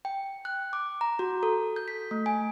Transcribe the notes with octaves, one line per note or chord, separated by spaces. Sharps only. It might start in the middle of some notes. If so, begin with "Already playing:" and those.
G5
F#6
D6
A#5
F#4
A4
G6
B6
A3
G#5